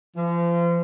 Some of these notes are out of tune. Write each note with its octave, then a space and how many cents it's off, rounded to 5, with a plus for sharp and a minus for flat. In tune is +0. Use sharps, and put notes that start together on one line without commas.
F3 -35